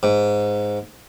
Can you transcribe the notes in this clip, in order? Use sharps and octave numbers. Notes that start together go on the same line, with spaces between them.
G#2